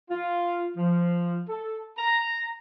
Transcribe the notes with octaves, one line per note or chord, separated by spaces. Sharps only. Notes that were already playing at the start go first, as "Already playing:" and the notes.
F4
F3
A4
A#5